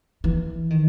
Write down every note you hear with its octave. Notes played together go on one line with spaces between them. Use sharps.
E3
D#3